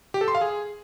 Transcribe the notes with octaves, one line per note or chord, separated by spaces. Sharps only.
G4
A4
C6
F5
G#4